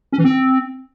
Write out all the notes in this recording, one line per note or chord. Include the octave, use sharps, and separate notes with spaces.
C#4
E3
C4